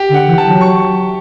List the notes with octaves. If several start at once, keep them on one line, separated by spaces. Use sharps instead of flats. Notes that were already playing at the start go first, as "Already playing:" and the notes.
Already playing: G4
D3
F#5
E3
A5
F#3
C#6